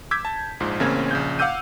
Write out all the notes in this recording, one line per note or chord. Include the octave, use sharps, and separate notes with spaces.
D6 E6 G6 G#6 B6
A5
A#1 G#2 F3
A1 C#3 A#3 C4 C#4 G#6
A#1 C#3 G6
F5 F#5 D6 E6 G6 D#7